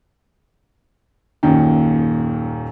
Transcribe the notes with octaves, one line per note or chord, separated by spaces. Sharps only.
D#1 F#2 A#2 D#3